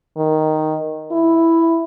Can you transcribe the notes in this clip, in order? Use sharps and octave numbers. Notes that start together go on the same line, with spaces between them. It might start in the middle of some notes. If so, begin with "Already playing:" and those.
D#3
E4